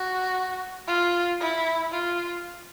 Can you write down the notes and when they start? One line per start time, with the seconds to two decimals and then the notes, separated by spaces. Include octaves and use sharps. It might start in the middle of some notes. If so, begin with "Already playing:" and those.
Already playing: F#4
0.88 F4
1.40 E4
1.92 F4